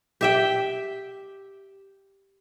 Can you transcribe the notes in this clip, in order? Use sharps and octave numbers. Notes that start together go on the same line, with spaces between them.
G4 E5 G5